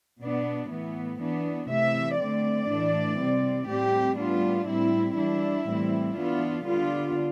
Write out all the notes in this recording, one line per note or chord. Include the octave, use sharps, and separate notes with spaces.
B2 B3 D4
A2 E3 B3
E3 B3 D4
C3 E3 A3 E5
D3 A3 C4 D5
A2 E3 A3 D4
C3 G3 C4
A2 G3 C4 G4
A2 G3 B3 D4 F4
A2 G3 C4 E4
E3 G3 D4 E4
A2 E3 G3 C4
E3 B3 D4 F4
D3 G3 B3 D4 F4